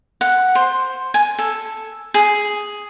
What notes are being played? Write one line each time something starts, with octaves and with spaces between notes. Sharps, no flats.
F#5
C5
G#5
A4
G#4